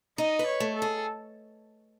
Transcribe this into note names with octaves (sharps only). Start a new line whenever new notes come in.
D#4 D#5
B4
C#5
A3
A4
G#4